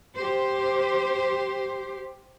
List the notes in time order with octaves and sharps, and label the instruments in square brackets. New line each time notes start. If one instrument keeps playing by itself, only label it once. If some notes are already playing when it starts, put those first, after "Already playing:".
[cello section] G4 C5